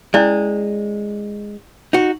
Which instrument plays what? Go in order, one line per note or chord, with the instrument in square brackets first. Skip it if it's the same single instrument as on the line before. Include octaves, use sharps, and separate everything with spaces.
[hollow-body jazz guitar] G#3 [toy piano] C#4 E4 D5
[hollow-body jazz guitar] D#4 F#4